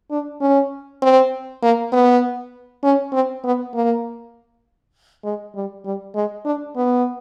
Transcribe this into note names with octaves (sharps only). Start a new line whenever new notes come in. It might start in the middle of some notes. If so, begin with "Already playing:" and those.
D4
C#4
C4
A#3
B3
C#4
C4
B3
A#3
G#3
G3
G3
G#3
D4
B3